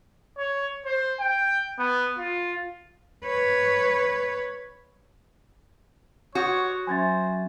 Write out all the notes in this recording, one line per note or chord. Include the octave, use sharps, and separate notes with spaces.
C#5
C5
G5
B3
F4
B4 C#5
F#4 C#5 C#6 D#6 G6
F#3 C#4 C5 E5 G#5 G#6 A6